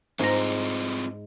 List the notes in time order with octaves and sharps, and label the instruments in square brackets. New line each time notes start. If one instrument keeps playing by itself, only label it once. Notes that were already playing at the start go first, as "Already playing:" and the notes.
[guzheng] G#2 A#5 [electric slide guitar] C4 F4 G#4